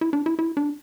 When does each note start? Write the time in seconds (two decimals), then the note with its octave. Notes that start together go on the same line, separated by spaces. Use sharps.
0.01 E4
0.13 D4
0.26 E4
0.39 E4
0.57 D4